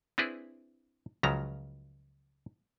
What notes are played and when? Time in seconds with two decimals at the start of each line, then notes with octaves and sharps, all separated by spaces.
0.18 C4 D4 E4 G#4 B4
1.23 C#2 C#3 F3 F#3 A#5